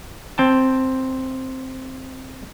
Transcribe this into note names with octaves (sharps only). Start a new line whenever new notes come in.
C4 G5 A5